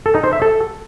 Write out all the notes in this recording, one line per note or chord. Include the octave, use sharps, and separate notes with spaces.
A4
D#4
C5
E5
A4